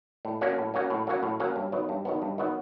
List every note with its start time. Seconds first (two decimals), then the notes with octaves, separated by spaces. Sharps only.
0.25 A2
0.41 F#3 A#3 C#4 F#4
0.58 A2
0.74 F#3 A#3 C#4 F#4
0.90 A2
1.07 F#3 A#3 C#4 F#4
1.23 A2
1.40 F#3 A#3 C#4 F#4
1.56 G2
1.72 D#3 F#3 B3
1.89 G2
2.05 D#3 F#3 B3
2.22 G2
2.38 D#3 F#3 B3